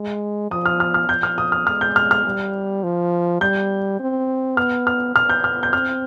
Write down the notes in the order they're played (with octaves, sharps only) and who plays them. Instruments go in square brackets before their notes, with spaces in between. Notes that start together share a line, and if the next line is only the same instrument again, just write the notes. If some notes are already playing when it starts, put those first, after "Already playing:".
Already playing: [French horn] G#3
[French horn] F3 [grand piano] D#6
[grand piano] F6
F6
F6
[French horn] F3 [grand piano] G6
[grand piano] F6
D#6
F6
[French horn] G#3 [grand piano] F6
[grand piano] G6
F6
F6
[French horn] G3
F3
[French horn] G3 [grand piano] G6
[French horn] C4
[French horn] B3 [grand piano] F6
[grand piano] F6
[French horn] B3 [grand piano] F6
[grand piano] G6
F6
G6
[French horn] C4 [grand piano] F6